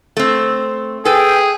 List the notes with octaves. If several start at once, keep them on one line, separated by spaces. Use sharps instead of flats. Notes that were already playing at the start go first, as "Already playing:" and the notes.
A3 C4
G#4 A4 B4 G5